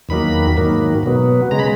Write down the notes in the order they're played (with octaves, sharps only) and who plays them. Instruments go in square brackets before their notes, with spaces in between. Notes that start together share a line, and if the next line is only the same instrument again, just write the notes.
[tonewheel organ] E2 D#3 F#3 A#3 B5
G#2 D#3 F#3 A#3
B2 F#3 B3
C#3 G#3 A#5
B5